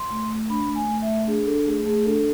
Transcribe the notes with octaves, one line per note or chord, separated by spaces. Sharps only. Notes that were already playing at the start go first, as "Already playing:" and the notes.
Already playing: C6
A3
A3
D4 B5
A3
G#5
A3
E5
A3
D4 G#4
D4 A4
A3 G#4
A3 G#4
D4 A4